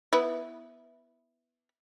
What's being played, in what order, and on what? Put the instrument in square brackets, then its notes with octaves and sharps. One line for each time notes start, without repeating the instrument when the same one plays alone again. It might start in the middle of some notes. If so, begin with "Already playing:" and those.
[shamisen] B3 E4